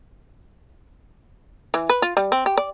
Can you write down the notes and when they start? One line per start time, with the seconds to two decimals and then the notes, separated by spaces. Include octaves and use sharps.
1.74 E3
1.89 B4
2.02 F4
2.17 G3
2.32 C4
2.46 G4
2.57 D5